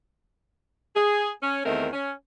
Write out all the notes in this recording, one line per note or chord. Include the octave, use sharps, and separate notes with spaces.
G#4
C#4
E2 D#3 A3 C4 A#4
C#4